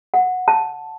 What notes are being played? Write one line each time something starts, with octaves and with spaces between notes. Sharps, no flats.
F#5
A5